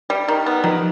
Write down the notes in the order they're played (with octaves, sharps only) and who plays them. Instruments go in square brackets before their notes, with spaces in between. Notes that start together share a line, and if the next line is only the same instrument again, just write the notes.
[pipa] G3
D#3
B3
[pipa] D#3 [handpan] F3